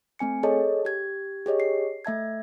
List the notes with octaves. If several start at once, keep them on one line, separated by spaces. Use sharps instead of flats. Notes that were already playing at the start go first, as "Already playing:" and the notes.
A3 C4 G#5 C#7
G#4 A4 C#5 D#5 A5
G4 G#6
G4 G#4 C#5 D#5
C7
A3 E5 A5 G#6